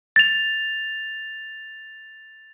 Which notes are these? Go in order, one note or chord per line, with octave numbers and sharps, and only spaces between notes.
A6 F7